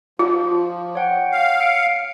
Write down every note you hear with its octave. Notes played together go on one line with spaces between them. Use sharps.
F3 F4
C#5 F#5 G5
F5
E6 C#7 D7